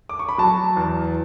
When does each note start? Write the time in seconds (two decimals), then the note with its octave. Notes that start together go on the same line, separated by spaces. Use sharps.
0.09 D6
0.19 C#6
0.29 B5
0.38 F#3 A5
0.77 E2